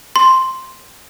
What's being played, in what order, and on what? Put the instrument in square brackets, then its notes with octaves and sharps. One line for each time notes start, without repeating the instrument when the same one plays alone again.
[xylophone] C6